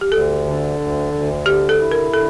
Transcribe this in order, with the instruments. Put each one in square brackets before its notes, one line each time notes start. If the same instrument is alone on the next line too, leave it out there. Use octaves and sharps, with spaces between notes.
[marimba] G4
[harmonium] D2 [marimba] A4
[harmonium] D3
D2
D2
[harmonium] D3 [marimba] G4
[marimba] A4
[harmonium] E4
[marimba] A#4
[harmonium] D3 [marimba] A4